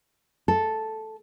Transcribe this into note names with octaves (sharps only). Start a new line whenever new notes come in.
A4